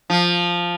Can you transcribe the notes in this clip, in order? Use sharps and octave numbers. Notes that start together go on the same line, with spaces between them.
F3